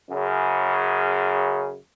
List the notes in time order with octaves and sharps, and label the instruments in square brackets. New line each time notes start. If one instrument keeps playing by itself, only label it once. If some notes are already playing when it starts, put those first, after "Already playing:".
[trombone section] F#2 C#3